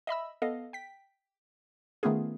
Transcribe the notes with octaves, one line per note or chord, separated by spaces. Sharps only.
D#5 E5 B5 E6
B3 A4 D#5 F5
G5 B6
D#3 A3 B3 C#4 F4 G#4